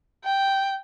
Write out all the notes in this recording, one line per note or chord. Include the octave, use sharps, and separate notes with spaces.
G5